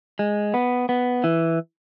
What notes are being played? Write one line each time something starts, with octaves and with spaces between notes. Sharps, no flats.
G#3
B3
B3
E3